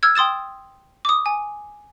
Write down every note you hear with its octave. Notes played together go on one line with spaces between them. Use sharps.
E6 F6 G#6
G5 C6 D#6 A6 E7
D6 D#6
G#5